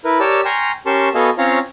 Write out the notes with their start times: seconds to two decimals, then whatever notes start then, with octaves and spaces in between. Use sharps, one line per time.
0.05 E4 A#4 B4
0.20 G4 A#4 C#5 D5 A5 E6
0.45 G5 G#5 A#5 C6 C#6 F6
0.86 C#4 G4 A#4 A5 C6 C#6
1.15 B3 F#4 A4 D#5 F5 G#5
1.38 C4 C#4 F4 C#5 F5 A#5